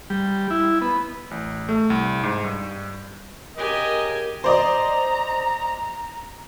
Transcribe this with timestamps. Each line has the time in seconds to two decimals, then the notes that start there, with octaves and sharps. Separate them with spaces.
0.10 G3
0.51 E4
0.82 B3
1.31 A1
1.69 A3
1.90 C2
2.24 G#2
2.44 G2
3.57 C#3 G4 A#4 D#5 G#5
4.44 C5 D5 D#5 A#5